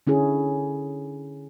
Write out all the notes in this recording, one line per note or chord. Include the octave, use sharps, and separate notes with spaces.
D3 C#4 E4 G#4